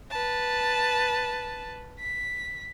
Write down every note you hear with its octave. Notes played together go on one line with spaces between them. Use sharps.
B4 A5
B6